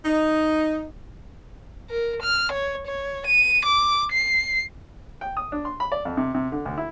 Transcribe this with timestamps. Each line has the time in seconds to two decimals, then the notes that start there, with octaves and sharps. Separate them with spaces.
0.05 D#4
1.90 A#4
2.22 F6
2.52 C#5
2.87 C#5
3.27 D#7
3.65 D6
4.12 C7
5.21 G5
5.37 D#6
5.52 D4
5.65 C6
5.80 B5
5.92 D5
6.05 F2
6.17 C3
6.35 C3
6.52 D3
6.66 D2
6.78 E4